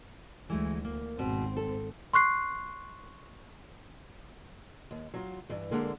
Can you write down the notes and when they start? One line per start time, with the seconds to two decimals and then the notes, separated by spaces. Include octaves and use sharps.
0.50 D2 E3 G#3 A3
0.85 A#3
1.19 G#1 B2 C4
1.57 A4
2.14 C6 C#6 F#6 C7
4.91 D#2
5.14 F#3 F4
5.50 G2 E3
5.71 D3 G#3 A#3